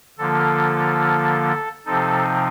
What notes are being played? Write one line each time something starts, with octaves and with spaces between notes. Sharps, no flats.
D3 F3 A#3 F4 A4
C3 F3 C4 D#4 A4